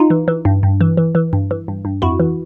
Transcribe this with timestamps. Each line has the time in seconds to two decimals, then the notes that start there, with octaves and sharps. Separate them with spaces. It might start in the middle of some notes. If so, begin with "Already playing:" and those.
Already playing: D#4 F4
0.10 E3
0.28 E3
0.45 G2
0.63 G2
0.81 E3
0.97 E3
1.15 E3
1.33 G2
1.51 E3
1.68 G2
1.85 G2
2.02 F2 E4 F#4
2.20 E3